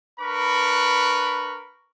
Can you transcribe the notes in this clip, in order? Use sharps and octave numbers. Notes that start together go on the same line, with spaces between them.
D4 A#4 B4 B5 C#6